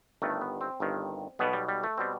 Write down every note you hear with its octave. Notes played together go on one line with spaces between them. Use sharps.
G1 G2 D#3 A3
B3
C4
G1 G2 D#3
B1 B2 G3 B3
G3
G3
A3
B2 G3 C4